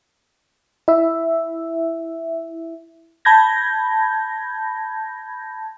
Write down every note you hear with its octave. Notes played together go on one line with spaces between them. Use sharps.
E4 E5
A5 B5 G6 G#6 A#6